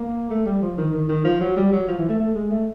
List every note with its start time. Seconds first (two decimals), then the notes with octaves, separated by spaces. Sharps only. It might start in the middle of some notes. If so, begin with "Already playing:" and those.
Already playing: A#3
0.30 A3
0.46 G3
0.62 F3
0.78 D#3
0.93 D#3
1.09 D#3
1.25 F3
1.41 F#3
1.57 G3
1.72 F#3
1.88 F3
1.99 E3
2.09 A3
2.20 A3
2.35 G#3
2.51 A3